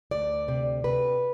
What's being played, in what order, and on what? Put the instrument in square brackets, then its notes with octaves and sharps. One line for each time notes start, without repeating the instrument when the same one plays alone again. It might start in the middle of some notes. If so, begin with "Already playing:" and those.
[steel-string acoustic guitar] D2 D5
C3
C3 B4